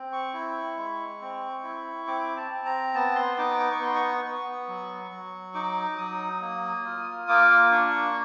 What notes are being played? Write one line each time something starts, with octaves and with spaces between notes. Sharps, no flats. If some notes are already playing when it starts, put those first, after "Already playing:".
Already playing: C4
C#6
E4
G#3
C4
E4
C4 D6
A5
C4
A#5
B3 A5
C6
D#4 D6
D6
C#6
B3 C6
C#6
B3
F#3
F#3
D#4 D6
F#3 D#6
A#3
F4
A#3 D6
D4 C#6